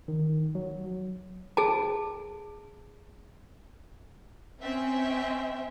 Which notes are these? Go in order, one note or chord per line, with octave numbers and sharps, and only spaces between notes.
D#3
F#3
G#4 A5
C4 C#4 E5